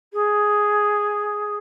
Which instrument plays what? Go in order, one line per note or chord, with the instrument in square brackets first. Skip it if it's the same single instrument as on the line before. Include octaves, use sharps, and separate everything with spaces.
[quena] G#4